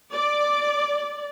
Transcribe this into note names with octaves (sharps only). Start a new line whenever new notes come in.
D5 D6